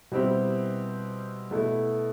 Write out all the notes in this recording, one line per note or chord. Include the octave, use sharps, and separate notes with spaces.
B2 G3 C4 E4 G4
B2 A3 E4